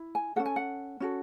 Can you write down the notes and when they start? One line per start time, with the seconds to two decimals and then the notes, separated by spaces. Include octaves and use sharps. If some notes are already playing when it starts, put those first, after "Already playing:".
Already playing: E4
0.15 G#5
0.36 C#4 F#4 A4 F#5
0.46 G#5
0.56 F#5
1.00 C#4 F#4 A4